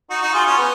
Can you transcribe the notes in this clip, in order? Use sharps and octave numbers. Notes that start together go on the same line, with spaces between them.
D#4 F#4
D#4 F#4
F4 G#4
C#4 F4
B3